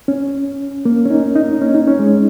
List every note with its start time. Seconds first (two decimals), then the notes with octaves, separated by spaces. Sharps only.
0.08 C#4
0.85 A#3
1.05 C#4
1.10 D#4
1.35 D#4
1.62 C#4
1.74 D#4
1.88 C#4
1.99 G#3